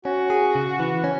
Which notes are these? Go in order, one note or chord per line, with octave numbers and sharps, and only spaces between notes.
C#4 F#4
G#4
C#3
E3
C#4